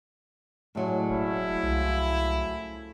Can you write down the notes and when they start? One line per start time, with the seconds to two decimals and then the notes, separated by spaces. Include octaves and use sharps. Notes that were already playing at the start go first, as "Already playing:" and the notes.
0.75 A2 D3 F#3 G#3 A3
1.09 E1 C#4 E4
1.63 C2 F3